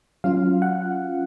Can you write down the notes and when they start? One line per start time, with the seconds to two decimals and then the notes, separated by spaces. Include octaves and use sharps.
0.24 F#3 C#4 F4 F5
0.62 F#5